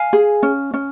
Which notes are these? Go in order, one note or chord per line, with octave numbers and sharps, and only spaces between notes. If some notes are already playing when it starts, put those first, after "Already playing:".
Already playing: F5 G#5
G#4
C#4
C#4